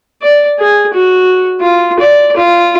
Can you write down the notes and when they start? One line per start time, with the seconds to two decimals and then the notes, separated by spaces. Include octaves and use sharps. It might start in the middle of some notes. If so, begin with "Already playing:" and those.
0.22 D5
0.59 G#4
0.93 F#4
1.61 F4
1.99 D5
2.37 F4